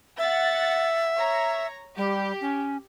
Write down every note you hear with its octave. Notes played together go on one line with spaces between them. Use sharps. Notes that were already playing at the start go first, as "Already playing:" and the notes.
E5 F#5 A6
C#5 A#5
G3 G4
C#4